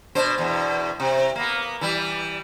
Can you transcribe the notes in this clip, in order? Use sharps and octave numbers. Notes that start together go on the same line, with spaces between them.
B2 D4 C5
E2 B2
C3
A#3 B3
E3 G3